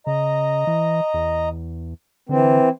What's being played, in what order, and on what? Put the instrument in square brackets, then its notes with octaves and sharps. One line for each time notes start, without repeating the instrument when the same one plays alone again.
[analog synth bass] C#3 [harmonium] D#5 A#5
[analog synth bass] E3
E2
[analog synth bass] D3 [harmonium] E3 C4